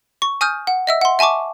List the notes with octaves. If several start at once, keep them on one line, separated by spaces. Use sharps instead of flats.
C#6
G#5 D#6 F6 G6
F#5
D#5 E5 E6
F#5 C6
E5 G#5 A5 C#6 D6